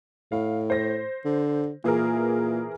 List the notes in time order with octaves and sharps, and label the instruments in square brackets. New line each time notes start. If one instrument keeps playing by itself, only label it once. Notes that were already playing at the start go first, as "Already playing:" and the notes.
[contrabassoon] A2 [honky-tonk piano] F5
[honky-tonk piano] C5 A#6
[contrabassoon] D3
[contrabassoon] A#2 [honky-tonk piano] E3 G#4 A#4